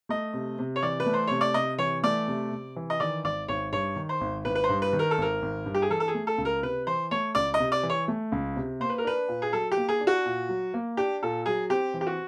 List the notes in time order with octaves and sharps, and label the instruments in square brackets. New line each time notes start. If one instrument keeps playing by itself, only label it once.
[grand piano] A3 [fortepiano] D#5
[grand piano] C3
C3
[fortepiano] C#5
[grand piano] E3 [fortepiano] D5
[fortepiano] B4
[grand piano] A3
[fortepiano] C5
[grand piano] C3 [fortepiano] C#5
[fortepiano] D5
[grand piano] C3 [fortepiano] D#5
[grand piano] E3 [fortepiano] C#5
[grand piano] A3 [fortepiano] D5
[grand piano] C3
C3
E3
[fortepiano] D#5
[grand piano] D#3 [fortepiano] D5
[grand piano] G#1 [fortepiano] D5
[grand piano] G#1 [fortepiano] C#5
[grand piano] G2 [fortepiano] C#5
[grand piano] D#3
[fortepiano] C5
[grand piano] G#1
[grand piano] G#1 [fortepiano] B4
[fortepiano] B4
C5
[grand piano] G2
[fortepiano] B4
[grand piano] D#3
[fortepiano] A#4
A4
[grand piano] G#1 [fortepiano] A#4
[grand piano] G#1
G2
[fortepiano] G4
G#4
[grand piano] E3 [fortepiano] A4
[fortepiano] A4
G#4
[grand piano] A3
[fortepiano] A4
[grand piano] C#2
[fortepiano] A#4
[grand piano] C3 [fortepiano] B4
[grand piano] E3 [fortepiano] C5
[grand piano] A3 [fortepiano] C#5
[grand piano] C#2 [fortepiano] D5
[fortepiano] D#5
[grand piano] C3
[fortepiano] D5
[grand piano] E3
[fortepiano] C#5
[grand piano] A3
C#2
C3
[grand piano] A#3 [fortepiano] C5
[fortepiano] B4
A#4
[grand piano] D4 [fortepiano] B4
[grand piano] A#2
[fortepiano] G#4
[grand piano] F#3 [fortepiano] A4
[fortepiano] G4
[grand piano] A#3
[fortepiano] G#4
[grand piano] D4
[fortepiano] F#4
[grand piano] A#2
F#3
A#3
[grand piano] D4 [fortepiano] G4
[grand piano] A#2 [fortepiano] A4
[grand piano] F#3 [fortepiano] G#4
[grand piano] C4 [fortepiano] G4
[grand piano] E3
[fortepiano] G4
F#4